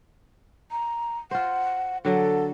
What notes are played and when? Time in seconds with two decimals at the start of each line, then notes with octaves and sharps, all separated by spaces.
0.71 A#5
1.31 F4 C5 F#5
2.05 D3 F#3 A4